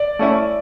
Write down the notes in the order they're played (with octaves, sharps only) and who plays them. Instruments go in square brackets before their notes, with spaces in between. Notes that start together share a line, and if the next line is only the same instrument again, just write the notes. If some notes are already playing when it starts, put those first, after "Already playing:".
Already playing: [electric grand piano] D5
[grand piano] A3 C#4 E4